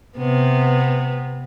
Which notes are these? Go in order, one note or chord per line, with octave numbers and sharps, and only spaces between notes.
C3 B3